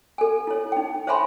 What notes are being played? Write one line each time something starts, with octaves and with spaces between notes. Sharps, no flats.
A4 G#5
E4 C#5
D#4 G5
C5 C#5 E5 G#5 B5 C6